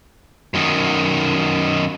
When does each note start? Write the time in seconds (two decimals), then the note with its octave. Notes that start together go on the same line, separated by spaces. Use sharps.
0.54 F#2 D#3